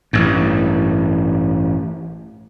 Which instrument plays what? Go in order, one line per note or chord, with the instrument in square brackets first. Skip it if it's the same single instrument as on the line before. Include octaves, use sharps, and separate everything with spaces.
[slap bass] A1 G2